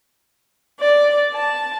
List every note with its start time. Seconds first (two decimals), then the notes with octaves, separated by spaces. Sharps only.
0.79 D5
1.33 A5